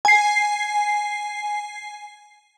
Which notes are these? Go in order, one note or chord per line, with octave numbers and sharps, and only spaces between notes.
G#5 C7